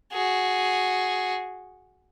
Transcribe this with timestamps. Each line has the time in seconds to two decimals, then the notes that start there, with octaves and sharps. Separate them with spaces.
0.13 F#4 G#4